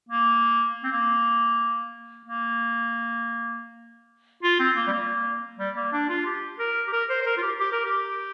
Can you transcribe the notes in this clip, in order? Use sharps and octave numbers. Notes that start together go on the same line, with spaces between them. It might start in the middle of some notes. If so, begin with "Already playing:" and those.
A#3
C4
A#3
A#3
F4
C4
A#3
G3
A#3
G3
A#3
D4
F4
G4
A#4
G4
A#4
C5
C5
A#4
F4
G4
G4
A#4
G4